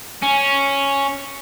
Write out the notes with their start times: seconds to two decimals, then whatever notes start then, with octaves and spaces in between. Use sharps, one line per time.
0.22 C#4